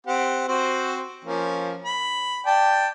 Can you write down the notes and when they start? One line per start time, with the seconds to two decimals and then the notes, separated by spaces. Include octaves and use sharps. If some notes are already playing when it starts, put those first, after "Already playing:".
0.07 C4 G4 F#5
0.48 C4 F#4 C5
1.25 F3 A#3 C#4
1.85 B5
2.46 D5 G5 A5